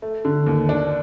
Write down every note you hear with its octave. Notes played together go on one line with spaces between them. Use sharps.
A3
D3
D#2
D4